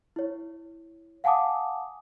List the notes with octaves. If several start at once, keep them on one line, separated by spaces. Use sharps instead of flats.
E4 C#5
F5 F#5 G#5 A5 D6 D#6